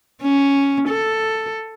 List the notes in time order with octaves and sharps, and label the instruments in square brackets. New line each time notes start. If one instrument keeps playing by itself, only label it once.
[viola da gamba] C#4
A4